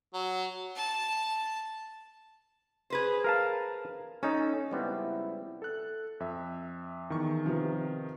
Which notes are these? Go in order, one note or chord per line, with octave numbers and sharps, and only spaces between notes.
F#3
A5
G#4 B4 C5
A#4 F5 A5
C#4 D#4 A4
C#2 G3 B3 C4 E4
A4 F#6
F2 E5
E2 D#3 C#6
C3 F3 B3